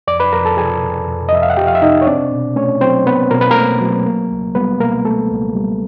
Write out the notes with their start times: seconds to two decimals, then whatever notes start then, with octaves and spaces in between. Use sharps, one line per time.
0.08 F2 D5 D6
0.20 B4 B5
0.33 F2 A#4 A#5
0.45 A4 A5
0.57 F3 G#4 G#5
0.83 C3
1.07 F2
1.29 D#5
1.32 F2 E5
1.42 F5
1.50 F#5
1.57 F3 G4 G5
1.67 F5
1.75 E5
1.82 C3 D#4 D#5
2.02 C#5
2.07 C4 D4 D5
2.31 B2
2.56 A3 C#4 C#5
2.81 F#3 C4 C5
3.06 B3 C4 B4
3.31 B2 A#4
3.41 B4
3.51 A#3 A#4
3.56 A3
3.81 F#3
4.06 A#3
4.31 C#2
4.55 G3 B3 B4
4.80 B2 A#3 A#4
5.05 A3 A#3 A4
5.30 C#2
5.55 G3